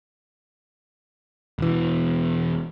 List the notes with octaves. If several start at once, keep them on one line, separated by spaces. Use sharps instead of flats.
E1 E3